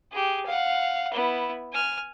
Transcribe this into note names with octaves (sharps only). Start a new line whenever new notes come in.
G4 G#4
F5 F#5
B3 E4
G#5 F6